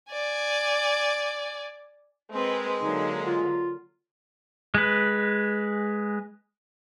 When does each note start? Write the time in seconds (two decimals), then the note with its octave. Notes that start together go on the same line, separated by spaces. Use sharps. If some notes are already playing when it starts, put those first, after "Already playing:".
0.12 D5 G#5
2.30 G#3 C4 A#4 B4
2.80 D3 F#3 A#3 D#4
3.26 F4
4.75 G#3 B4